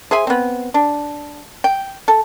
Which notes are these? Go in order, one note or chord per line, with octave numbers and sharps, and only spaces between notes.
G#4 C5 E5 G#5
B3 C4
D4
G5
A4